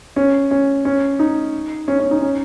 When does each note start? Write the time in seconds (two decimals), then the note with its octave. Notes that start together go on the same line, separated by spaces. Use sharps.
0.16 C#4
0.51 C#4
0.85 C#4
1.19 D#4
1.88 C#4
1.99 C#4
2.11 D#4
2.22 C#4